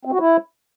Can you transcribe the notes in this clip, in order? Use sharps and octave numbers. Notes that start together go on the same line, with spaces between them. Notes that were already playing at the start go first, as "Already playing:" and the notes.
C4
F#4
E4